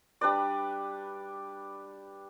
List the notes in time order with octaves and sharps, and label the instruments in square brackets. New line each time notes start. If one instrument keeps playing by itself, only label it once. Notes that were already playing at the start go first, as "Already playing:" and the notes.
[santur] G3 D4 B4 D5